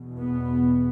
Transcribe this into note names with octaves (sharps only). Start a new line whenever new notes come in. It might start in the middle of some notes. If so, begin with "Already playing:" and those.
Already playing: E2 B2
B3